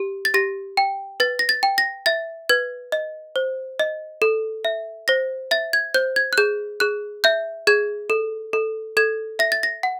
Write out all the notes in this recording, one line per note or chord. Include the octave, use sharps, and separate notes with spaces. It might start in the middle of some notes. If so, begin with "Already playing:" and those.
Already playing: G4
A6
G4 A#6
G5
B4 A6
A#6
A6
G5
A#6
E5 A6
B4 G#6
D#5
C5
D#5
A4
E5
C5 A#6
E5 A6
G#6
C5 G6
G#6
F#6
G#4 G6
G#4 F#6
E5 G6
G#4 G#6
A4
A4
A4 G#6
E5 A#6
A6
A#6
F#5